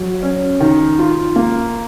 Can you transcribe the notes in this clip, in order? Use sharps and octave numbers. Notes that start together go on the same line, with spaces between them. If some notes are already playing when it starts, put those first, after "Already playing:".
Already playing: F#3
C#4
D#3
F4
A#3